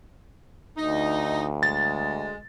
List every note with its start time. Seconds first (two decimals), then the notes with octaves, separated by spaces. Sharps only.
0.78 D2 D#4
1.63 G#3 A6